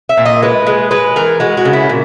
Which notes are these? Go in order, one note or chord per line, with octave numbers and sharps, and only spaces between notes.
E5
A#2
D#5
G#3 B4
G#3
G#3 B4
E3 A#4
G#3 F#4
F#4
C#3
E4
A#2